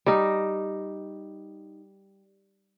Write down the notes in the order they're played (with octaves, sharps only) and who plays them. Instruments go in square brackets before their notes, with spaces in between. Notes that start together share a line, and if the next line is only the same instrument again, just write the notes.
[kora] G3 D#4